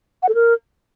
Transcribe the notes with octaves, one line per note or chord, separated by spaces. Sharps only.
F#5
A4
A#4